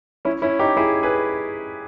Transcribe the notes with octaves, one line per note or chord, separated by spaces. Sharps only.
C#4 E4
C#4 E4
D#4 G4
E4 G#4
G#4 B4